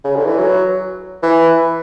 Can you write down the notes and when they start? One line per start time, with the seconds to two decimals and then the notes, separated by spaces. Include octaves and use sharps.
0.04 C#3
0.16 D3
0.26 E3
0.38 F#3
1.23 E3